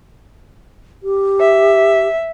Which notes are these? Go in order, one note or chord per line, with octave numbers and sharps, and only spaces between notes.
G4
E5